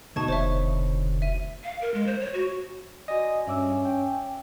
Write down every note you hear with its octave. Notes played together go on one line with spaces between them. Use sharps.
D2 B2 D#4 A5 C#6 G#6
F1 C5 C#5 E5
E5 D#7
F5
A#4
G#3
C5
C#5
F#4
F#4 D5 D#5 G#5
G2 C#4 E5 D6 E6
G5